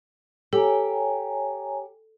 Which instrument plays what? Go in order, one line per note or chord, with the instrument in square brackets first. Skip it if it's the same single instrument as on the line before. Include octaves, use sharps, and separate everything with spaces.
[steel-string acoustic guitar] G4 G5 [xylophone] A4 [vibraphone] C#5 G#5 A#5